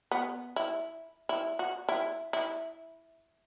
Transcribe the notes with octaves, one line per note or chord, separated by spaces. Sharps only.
B3
E4
E4
F#4
E4
E4